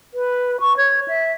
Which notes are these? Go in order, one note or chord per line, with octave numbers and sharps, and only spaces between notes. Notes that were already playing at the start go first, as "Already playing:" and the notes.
B4
C#6
C#5
E5